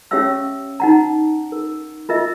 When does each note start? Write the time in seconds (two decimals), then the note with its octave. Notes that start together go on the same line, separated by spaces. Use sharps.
0.11 C#4 G4 C#5 E5 F5 E6
0.80 D#4 F#5 A#5
1.52 A#4
2.09 F4 A#4 D#5 E5